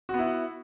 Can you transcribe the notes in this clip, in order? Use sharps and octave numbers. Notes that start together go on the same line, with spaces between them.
B3 E4 F#4